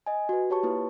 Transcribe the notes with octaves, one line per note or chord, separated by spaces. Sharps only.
D#5 G#5
F#4 B4
G4 C#5 A5 C#6
A#3 E4 F4 B4